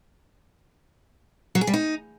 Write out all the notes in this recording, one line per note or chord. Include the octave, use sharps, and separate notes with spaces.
F#3
G#4
G3
D#4